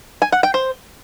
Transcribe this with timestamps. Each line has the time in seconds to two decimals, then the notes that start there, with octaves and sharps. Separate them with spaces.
0.22 G#5
0.32 F#5
0.43 G5
0.54 C5